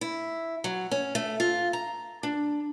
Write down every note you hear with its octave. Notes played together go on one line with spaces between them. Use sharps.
E4
F#3
C#4
A3
F4
A#5
D4